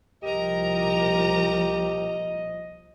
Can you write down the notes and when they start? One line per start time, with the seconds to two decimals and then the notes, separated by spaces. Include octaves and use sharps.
0.23 C2 A#2 F3 G4 A#4 D#5 A#5